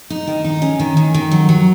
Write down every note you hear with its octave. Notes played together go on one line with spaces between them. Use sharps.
D#4
D#3
D#4
C#4
D#3
D#3
D#3
F#3
F#3